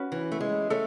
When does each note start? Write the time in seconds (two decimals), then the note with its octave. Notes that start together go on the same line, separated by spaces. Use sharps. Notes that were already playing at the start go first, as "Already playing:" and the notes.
Already playing: C#4 F#4 B4
0.12 E3
0.32 A3
0.40 G#3
0.70 A3 A4 C#5